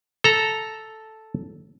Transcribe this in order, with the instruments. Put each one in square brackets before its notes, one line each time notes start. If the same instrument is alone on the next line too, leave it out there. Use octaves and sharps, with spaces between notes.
[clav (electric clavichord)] A4 A#5